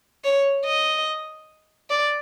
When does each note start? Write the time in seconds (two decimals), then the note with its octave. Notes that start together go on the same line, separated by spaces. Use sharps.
0.24 C#5
0.65 D#5
1.90 D5